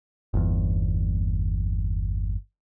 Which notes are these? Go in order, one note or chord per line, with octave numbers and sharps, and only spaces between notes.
G1 E2